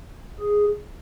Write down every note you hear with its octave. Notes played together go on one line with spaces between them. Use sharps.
G#4